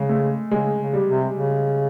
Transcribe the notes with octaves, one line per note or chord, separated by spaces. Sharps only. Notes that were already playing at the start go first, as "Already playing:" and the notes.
Already playing: C#3 G#3
A3
C#3 G#3
C#3
G3
C3
C#3